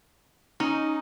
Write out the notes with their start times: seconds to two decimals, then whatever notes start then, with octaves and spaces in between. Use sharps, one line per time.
0.60 C#4 D#4